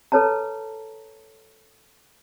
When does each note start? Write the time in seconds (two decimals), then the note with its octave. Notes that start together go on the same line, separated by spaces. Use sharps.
0.12 A4 B4 C#5 A5 A#5